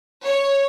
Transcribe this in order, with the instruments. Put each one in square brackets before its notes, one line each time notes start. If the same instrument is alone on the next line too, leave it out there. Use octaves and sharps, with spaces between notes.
[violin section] C#5